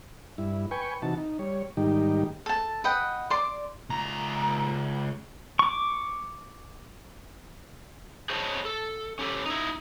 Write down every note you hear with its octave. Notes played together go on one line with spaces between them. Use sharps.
G2 E4
B4 G5 G#5 C#6
C3 E3 D#4 F#4 A5
D#4
G3 C#5
G#2 D#3 G3 D#4 G4
A4 A5
B4 D#5 F#5 G5
D5 C6 D6
C#2 A#5
C#6 D6
G#4 C5 C#5 D#5 G#5 A5
A4
C#4 G4 A4
D#4 E4